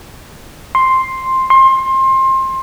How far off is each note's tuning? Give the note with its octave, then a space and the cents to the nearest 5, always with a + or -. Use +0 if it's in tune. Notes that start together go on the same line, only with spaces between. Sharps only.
C6 +5
C6 +25